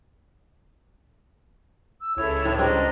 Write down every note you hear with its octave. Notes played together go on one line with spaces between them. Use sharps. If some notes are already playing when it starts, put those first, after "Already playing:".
E6
C#2 E4 A4 C#5
A2
G3 C4 D4 D#5 A#5